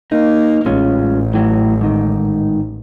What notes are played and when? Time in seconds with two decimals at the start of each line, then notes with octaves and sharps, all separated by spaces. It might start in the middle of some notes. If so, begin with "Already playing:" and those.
0.12 A#3 D#4
0.66 A1 G#3 C#4 F4
1.34 A2 E3 F#3
1.81 G#2 D#3